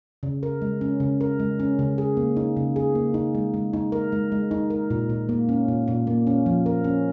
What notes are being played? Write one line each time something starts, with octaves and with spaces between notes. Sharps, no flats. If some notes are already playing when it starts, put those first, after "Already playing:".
C#3
A#4
G#3
C#4
C#3
A#4
G#3
C#4
C#3
G#4
A#3
D#4
C#3
G#4
A#3
D#4
G#3
G#3
D#4
A#4
G#3
G#3
D#4
A#4
A#2
A#2
A#3
C#4
A#2
A#2
A#3
C#4
F3
A#4
C#4